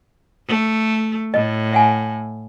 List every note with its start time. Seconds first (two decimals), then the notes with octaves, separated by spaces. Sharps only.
0.48 A3
1.34 A2 D#5
1.72 E5 F#5 G#5